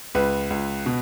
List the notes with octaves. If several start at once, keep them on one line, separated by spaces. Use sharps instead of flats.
C#2 B4
C#2
B2